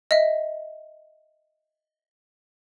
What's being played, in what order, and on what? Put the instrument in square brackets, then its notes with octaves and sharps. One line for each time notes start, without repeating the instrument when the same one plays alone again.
[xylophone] D#5 E5